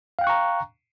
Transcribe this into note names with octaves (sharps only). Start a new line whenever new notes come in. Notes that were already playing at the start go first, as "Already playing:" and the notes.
F5 G5 A#5 C#6 F#6